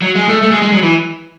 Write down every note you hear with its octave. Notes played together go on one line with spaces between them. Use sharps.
F#3
G#3
A3
A3
G#3
G#3
F#3
E3